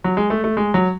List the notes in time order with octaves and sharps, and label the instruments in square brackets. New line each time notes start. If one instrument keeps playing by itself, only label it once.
[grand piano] F#3
G#3
A3
A3
G#3
F#3